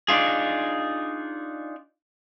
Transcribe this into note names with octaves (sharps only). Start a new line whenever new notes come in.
D4 D#4 F4 G#4